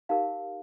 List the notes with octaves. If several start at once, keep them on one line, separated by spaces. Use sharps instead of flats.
D#4 G4 A#4 F5